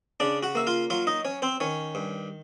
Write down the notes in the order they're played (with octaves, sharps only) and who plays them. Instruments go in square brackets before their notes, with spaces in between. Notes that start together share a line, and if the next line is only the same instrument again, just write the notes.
[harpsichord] C#3 D4 D5
F#4 F#5
A#3 E5
F4 F5
F#3 F4 F5
D#4 D#5
C#4 C#5
C4 C5
D#3 C#4 C#5
G2